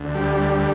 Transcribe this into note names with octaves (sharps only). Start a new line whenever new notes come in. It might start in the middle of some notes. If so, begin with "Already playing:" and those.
Already playing: D2
G3